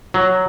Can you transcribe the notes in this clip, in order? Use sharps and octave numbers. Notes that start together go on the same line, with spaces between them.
F#3